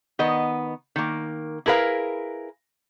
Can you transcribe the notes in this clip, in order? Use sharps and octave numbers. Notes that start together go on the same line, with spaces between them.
D#3 B3 D#5
D#3 A#3
E4 G#4 A#4 B4 F5